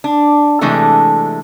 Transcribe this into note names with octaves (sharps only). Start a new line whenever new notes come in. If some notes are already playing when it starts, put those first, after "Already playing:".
D4
C3 E3 G#3 A3 D4 A4